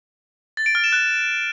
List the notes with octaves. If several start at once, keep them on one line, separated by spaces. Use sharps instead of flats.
A6
D7
F6
E7
F#6